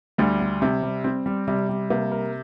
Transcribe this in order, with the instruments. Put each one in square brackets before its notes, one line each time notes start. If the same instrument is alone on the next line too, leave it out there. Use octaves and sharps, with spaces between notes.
[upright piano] D2 D3 [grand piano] G3
[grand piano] G3
[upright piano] C3 [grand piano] C4
[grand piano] G3
C4
G3
[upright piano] C3 [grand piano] G3
[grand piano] G3
[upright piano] C3 [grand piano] A#3
[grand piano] A#4